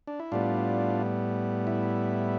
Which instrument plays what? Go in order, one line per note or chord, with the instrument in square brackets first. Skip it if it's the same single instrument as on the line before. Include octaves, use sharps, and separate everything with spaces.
[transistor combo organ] D4
E4
A2 G3 B3 D4 F4
E4